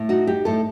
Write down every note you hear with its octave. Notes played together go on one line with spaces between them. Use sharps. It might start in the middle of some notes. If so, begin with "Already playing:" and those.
Already playing: A2
D#4 F#4
D#4 G4
A2 A4